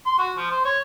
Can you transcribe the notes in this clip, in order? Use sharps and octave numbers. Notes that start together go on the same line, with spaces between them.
C6
F#4
F3
C5
C#5